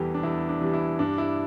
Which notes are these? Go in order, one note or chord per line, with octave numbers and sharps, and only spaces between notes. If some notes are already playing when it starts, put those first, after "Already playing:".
Already playing: E2 E3 G3 G4 A4
D4
E2 E4
D4
E3 G3
E4
G2 D4
E4